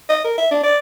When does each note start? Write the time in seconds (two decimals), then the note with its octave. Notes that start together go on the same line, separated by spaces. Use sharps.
0.09 D#5
0.25 A#4
0.38 E5
0.51 D4
0.63 D5